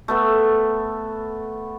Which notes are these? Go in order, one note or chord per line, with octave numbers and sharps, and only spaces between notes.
A3 B3 A4